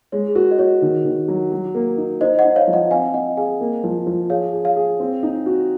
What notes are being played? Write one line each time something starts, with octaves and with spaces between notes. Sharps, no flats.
G#3 C#5
G#4
F#4 A#4
D#5
F#4 C#5
D#3
D#3
F#3
F#3
A#3
D#4
D#4 C5 D#5
D#5 F#5
D#4
C#5 F5
F3
D#5 F#5
C4 F5 G#5
C4 D#5 F#5
G#4 F5 G#5
A#3
F3
F3
G#4 C#5 F5
G#4
C#5 F5
G#4
C4
D#4
F#4